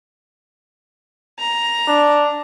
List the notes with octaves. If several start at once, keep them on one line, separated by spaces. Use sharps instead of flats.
A#5
D4